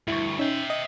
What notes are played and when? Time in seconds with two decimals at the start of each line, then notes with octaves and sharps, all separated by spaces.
0.08 D2 G2 E4 C#6
0.39 C#4 D#4 C#5 E5 G5
0.70 D#5